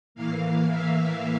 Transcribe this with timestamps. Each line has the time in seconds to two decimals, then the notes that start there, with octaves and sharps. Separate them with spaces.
0.15 A2 E3 A#3 F5
0.68 E5